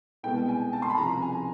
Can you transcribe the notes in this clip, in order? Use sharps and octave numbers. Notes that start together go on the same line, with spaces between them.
C2 B2 G#3 B3 G5
G#5
A5
C6
B5
C#2 C3 F3 A#5
G#5